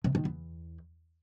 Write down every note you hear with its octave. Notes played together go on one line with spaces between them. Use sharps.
C3
D#3
E2